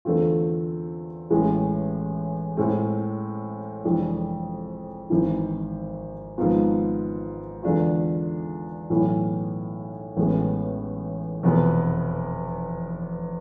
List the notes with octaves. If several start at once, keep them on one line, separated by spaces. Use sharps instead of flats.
E2 D3 A3 C4 F4
A1 A2 E3 G#3
A2 G#3 C4
F1 F2 E3 G#3 D4
G#1 G#2 E3
G#1 G#2 F3 B3 F4
E2 D3 G#3 D4 F4
B1 A2 E3
A1 A2 G#3 B3
F1 E2 B2 B3